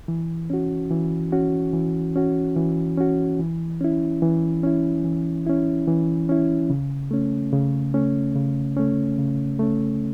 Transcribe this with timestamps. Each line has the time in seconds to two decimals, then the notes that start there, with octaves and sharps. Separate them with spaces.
0.08 E3
0.50 C#4 F#4
0.91 E3
1.32 C#4 F#4
1.73 E3
2.16 C#4 F#4
2.56 E3
2.97 C#4 F#4
3.39 E3
3.81 C#4 E4
4.22 E3
4.63 C#4 E4
5.05 E3
5.46 C#4 E4
5.88 E3
6.29 C#4 E4
6.70 C#3
7.11 A3 C#4
7.53 C#3
7.94 A3 C#4
8.36 C#3
8.77 A3 C#4
9.19 C#3
9.59 A3 C#4